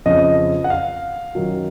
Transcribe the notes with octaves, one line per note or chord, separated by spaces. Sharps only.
F2 C#3 F3 D#5
F#5
F5
F#2 D#3 F#3